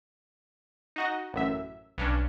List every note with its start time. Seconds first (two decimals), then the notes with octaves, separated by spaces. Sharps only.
0.96 D#4 F#4 D#5
1.34 A1 F#2 E5
1.98 B1 G2 C#4 D4